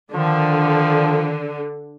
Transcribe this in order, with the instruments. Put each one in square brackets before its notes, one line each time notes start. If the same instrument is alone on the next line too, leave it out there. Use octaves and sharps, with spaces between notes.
[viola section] D3 [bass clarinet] D#3 [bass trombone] F3